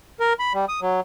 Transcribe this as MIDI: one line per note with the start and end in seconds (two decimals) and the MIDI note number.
0.20 0.33 70
0.39 0.53 83
0.54 0.65 55
0.69 0.80 87
0.81 1.00 54